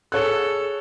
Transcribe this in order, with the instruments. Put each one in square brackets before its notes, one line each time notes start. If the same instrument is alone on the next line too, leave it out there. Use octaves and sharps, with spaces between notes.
[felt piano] G#4 C#5 F#6 [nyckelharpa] A4